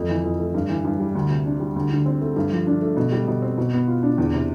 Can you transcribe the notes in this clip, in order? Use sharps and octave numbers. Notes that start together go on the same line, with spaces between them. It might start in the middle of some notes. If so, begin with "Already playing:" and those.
Already playing: F2 A3
E3
F2
A3
G2
E3
G2
G3
D2
C3
D4
G3
D2
D3
C4
A3
G2
F3
D4
A3
B2
G3
B2
C4
B2
B3
F4
D4
E2
C3